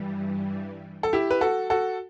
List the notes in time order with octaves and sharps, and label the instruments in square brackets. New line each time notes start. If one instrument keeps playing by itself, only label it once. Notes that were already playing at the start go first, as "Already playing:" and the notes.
Already playing: [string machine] G2 E3 G3
[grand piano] A4
E4 G4
B4
F#4 A4
F#4 A4